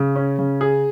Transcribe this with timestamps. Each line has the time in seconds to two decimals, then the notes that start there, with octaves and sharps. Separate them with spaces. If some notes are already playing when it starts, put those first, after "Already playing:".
Already playing: C#3
0.16 C#4
0.39 C#3
0.61 G#4